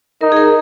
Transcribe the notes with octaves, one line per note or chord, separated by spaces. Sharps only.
D#4 A#4
G#4
A#4